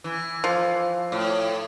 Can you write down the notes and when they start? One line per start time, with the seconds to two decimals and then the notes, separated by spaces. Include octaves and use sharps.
0.04 E3
0.44 F3
1.12 A2